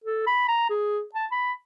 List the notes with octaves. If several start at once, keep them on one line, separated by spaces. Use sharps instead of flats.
A4
B5
A#5
G#4
A5
B5